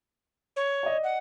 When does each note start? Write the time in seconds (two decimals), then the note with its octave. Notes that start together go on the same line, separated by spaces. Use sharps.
0.56 C#5
0.83 D5 D#5
1.03 F#5